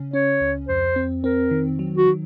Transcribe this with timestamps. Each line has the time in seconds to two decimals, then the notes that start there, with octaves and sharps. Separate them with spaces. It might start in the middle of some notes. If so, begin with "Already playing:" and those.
Already playing: C#3 C#4
0.13 C#4 C#5
0.41 C#2
0.68 F2 C5
0.96 C4
1.24 C4 A#4
1.51 D#3
1.79 F#3
1.97 F#4
2.07 D#3